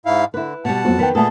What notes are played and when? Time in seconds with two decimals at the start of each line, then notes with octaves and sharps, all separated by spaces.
0.06 G#2 E4 F5
0.34 D3 E4 B4
0.65 B2 G3 F#5 A5
0.85 F2 F#3 F#4
0.99 D#3 B3 B4 G5
1.15 A#2 A3 B3 G#4 A4 A5